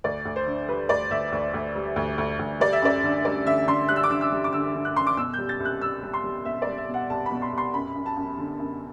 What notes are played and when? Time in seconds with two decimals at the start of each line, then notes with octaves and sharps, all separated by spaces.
0.04 D2 D5
0.25 D2
0.36 C5
0.46 D3
0.68 G3 B4
0.89 D2 D5
1.11 D2 E5
1.32 D2
1.54 D2
1.75 G3
1.96 D2
2.18 D2
2.39 D2
2.60 G3 D5
2.73 E5
2.82 F#2 D5
3.04 D3
3.25 G3 D5
3.46 D3 E5
3.68 D3 C6
3.89 G3 F#6
3.96 E6
4.03 D6
4.10 D3 E6
4.21 E6
4.32 G3
4.44 D6
4.53 D3 E6
4.74 D3
4.85 F#6
4.96 F#2 C6
5.07 D6
5.17 B2 E6
5.33 G3 G6
5.49 A6
5.60 C2
5.65 F#6
5.81 G3 E6
6.03 G3
6.13 C6
6.24 G3
6.45 B2 E5
6.62 D5
6.67 G3
6.78 E5
6.88 B2
6.94 F#5
7.10 C2 A5
7.26 B5
7.31 B2
7.42 C6
7.52 C2
7.58 C6
7.74 F#2 B5
7.95 F#2
8.06 A5
8.16 F#2
8.38 D3
8.59 F#2